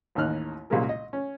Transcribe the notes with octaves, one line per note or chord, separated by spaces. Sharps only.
A1 D#2 A#3 D#4 F6 F#6
C2 A#2 C#3 G3 G#3 A#4
D#5
C#4